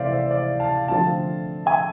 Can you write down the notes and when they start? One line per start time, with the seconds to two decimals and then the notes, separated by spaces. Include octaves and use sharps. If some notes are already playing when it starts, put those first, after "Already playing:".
Already playing: C3 E3 A3 C5 D5 E5 F5
0.12 C5 E5
0.31 D5 F5
0.60 F5 A5
0.88 D3 F3 A3 C4 F5 A5
1.66 E5 G#5